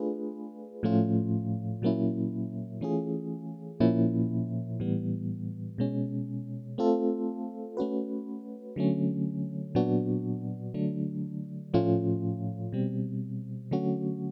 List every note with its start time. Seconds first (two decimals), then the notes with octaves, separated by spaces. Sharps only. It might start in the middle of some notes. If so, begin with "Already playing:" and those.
Already playing: A3 D4 F4 G#4 B4
0.83 A2 F3 A3 C#4 F4
1.82 A#2 F#3 A#3 C#4 E4
2.81 E3 A3 C#4 F4 G#4
3.80 A#2 F3 A#3 C#4 E4
4.80 A2 E3 G3 B3
5.78 B2 G#3 C#4
6.78 A3 C4 F4 A4
7.77 A3 C#4 F#4 B4
8.76 D3 F#3 A3 C#4
9.75 A#2 F#3 B3 D4 F#4
10.74 D3 F#3 A3 D4
11.74 A2 F3 A3 C#4 F4
12.72 B2 G3 C4
13.71 D3 F#3 A3 C#4 F#4